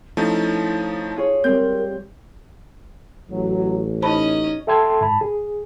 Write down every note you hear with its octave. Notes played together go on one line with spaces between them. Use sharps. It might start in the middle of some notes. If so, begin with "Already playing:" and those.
F3 A3 C#4 D#4 E4
F4 G#4 C#5
G3 C4 A#4 G6
A1 F#3
C#4 D#4 C5 D#5 A5 B5
A4 E5 G5 A5 C6 G#6
G#2 A5 B5
G#4